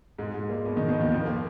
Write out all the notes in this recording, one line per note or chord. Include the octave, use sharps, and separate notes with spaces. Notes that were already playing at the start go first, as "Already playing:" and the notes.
G#2 G#3
G#2 G#3
A#2 A#3
B2 B3
D#3 D#4
B2 B3
D#2 D#3
F2 F3
A#3